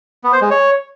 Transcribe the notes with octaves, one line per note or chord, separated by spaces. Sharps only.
B3
C5
G#3
C#5